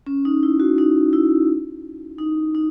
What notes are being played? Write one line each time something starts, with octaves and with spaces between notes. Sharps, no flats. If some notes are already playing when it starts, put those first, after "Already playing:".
C#4
D#4
E4
F#4
D#4
E4
D#4
D#4